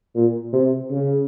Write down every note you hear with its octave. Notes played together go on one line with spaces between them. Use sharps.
A#2
C3
C#3